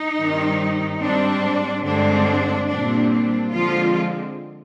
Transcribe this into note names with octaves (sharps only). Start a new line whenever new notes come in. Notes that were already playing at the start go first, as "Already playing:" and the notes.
Already playing: D#4
G2 D#3 G3 C4
G#2 G3 C4 D4
G2 D3 G#3 C4 D4
A#2 G3 C4 D4
D4
D3 F3 G#3 C4 F4